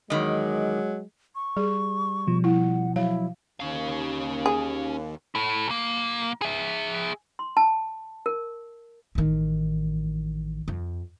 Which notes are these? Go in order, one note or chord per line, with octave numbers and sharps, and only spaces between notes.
E2 D#3 F#3 G#3 D#5
C#6
G3 G#4
B2 F3
E4 F#5
F#3 E4 F5
D#2 C#4 F5
G#4
E4 A4
B1 A#3
G#4 E5
C6
A5
A#4
A1 D#3
F2